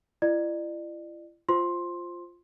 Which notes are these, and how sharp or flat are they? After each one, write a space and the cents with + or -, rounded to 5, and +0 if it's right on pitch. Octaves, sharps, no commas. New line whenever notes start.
E4 +40 D5 +40
F4 +0 C5 +5 C6 +10